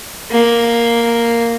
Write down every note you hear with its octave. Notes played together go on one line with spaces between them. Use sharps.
A#3